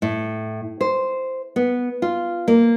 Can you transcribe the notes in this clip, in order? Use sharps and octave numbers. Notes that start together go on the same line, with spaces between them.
A2
C5
B3
F4
A#3